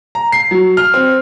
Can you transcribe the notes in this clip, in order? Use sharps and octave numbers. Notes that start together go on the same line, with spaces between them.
A#5
C7
F#3
F6
C4